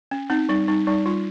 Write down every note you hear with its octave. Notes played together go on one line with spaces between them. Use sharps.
C#4
C4 D#4
G3 D#4
G3 D#4
G3 D#4
G3 F4